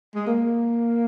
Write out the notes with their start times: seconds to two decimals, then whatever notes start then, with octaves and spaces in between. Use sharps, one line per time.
0.15 G#3
0.27 A#3